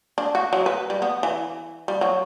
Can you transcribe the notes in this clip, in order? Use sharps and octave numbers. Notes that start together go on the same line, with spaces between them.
D4
F#4
F#3
B4
G3
B3
E3
G3
F#3